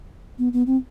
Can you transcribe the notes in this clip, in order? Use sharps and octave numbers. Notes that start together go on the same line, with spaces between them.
B3
B3
C4